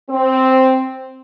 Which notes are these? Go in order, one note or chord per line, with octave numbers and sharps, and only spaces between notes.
C4